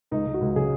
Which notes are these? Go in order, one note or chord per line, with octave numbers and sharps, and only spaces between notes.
C#2 D#4
C#2
F#4
C#2
C#3 G#4